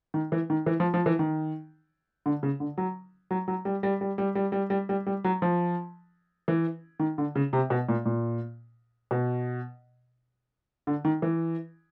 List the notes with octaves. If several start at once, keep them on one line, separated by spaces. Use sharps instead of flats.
D#3
E3
D#3
E3
F3
F3
E3
D#3
D3
C#3
D3
F#3
F#3
F#3
G3
G3
G3
G3
G3
G3
G3
G3
G3
F#3
F3
E3
D#3
D3
C#3
C3
B2
A#2
A#2
B2
D3
D#3
E3